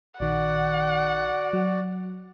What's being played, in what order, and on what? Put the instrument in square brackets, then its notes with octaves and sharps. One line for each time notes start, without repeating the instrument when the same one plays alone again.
[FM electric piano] A#1 D#3 [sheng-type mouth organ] F#4 D5 [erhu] F#5
[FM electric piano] F#3